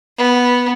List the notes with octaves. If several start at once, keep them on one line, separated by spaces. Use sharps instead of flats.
B3